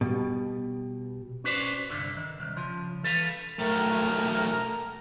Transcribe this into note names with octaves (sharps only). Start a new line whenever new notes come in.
B2 G3
C#4 F#4 B4 C5 D5
C2 G2 D3
D#3
C2
C#3 F3
E3 A4 B4 F5
B1 A3 A#4